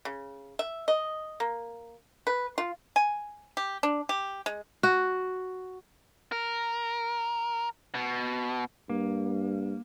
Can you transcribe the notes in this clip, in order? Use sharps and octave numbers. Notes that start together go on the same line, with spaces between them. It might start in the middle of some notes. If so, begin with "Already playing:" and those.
C#3
E5
D#5
A#3
B4
F4
G#5
G4
D4
G4
G#3
F#4
A#4
B2
G2 A#3